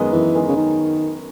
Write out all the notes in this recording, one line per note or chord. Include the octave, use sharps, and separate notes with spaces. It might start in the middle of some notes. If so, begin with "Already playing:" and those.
Already playing: F#2 D#3 G#3 B3
F#2 E3
D#3 G#3 B3
C#3
D#3